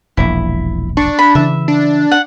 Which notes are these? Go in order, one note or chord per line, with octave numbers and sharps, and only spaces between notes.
E1 A#1 E4
D4 C#6
B5
C#3 E3 E5
D4
F#5